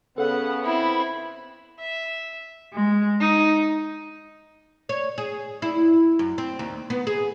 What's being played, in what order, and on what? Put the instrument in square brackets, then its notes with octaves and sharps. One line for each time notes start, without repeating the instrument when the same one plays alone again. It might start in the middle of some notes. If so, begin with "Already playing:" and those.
[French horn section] C#3 B3 [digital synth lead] A4 [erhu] F#5
[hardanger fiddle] C4 E4 [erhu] B5
[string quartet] E5
G#3
D#4
[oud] C#5
G#4
E4
F#2
C4
D#2
B3
G#4